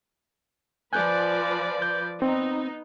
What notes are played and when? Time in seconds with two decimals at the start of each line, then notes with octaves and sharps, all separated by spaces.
0.93 F3 B4 D5 G#5 F#6 G6
1.82 G6
2.22 B3 C4 D#4